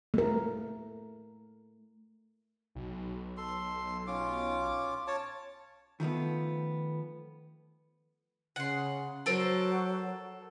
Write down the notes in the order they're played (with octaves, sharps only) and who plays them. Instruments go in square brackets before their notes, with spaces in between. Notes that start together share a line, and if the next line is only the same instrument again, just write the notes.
[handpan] A3 A#4
[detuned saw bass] B1
[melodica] A4 C6
C#4 F4 D6
C#5 A5
[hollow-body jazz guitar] D#3 F3 A3 B3
[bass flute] C#3 [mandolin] F#5 C6
[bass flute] F#3 [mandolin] A4 A#4 C5